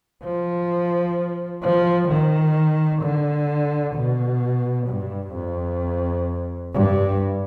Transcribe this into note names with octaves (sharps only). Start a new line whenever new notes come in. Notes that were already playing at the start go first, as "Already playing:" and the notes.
F3
F3
D#3
D3
B2
G2
F2
G2